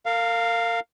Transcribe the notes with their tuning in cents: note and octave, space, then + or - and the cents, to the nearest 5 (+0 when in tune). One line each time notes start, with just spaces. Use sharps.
A#4 -35 F5 +0